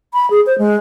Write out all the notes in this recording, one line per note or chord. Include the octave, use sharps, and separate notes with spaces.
B5
G#4
C5
G#3